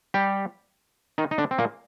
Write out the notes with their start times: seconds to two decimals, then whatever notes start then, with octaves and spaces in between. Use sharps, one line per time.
0.14 G3 G4
1.18 D#3 D#4
1.31 D#4
1.38 D3 D4
1.51 C4
1.58 A#2 A#3